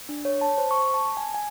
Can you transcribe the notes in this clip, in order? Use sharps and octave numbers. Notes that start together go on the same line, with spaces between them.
D4
C#5
A5
C5
C#6
A5
G#5
G#5